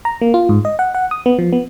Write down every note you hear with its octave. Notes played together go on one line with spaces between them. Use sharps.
A#5
A#3
F4
G#2
D#5
F#5
F#5
D#6
B3
F3
B3